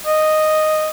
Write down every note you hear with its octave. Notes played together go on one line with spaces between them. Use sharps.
D#5